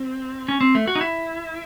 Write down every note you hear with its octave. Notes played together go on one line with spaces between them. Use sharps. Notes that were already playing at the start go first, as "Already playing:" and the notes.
Already playing: C4
C#4
C4
A3
F#4
D#4
E4